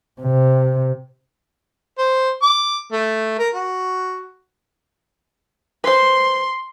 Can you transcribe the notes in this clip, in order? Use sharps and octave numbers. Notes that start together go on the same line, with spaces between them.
C3
C5
D6
A3
A#4
F#4
B4 C5 C6